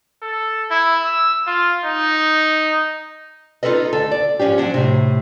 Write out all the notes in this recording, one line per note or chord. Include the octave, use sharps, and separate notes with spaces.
A4
E4
E6
F4
D#4
D#4 F4 F#4 A4 B4 D#5
D2 D3 A4
D5
G#2 F3 C#4 D4 G4
F3 F#3 D4 F#5
A2 C3